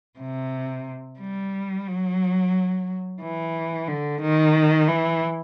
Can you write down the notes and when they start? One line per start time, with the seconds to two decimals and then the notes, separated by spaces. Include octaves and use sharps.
0.19 C3
1.20 G3
1.87 F#3
3.21 E3
3.88 D3
4.21 D#3
4.88 E3